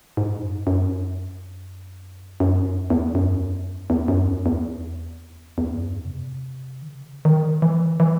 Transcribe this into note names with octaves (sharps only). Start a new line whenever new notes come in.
G#2
F#2
F#2
F#2
E2
E2
F#2
E2
F#2
E2
E2
E2
F#2
G#2
C#3
C3
D#3
C#3
D#3
E3
E3